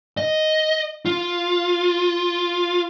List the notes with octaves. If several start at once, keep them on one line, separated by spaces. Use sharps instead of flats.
D#5
F4